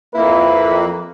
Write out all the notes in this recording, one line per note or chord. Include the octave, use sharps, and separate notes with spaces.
F2 A#3 E4 B4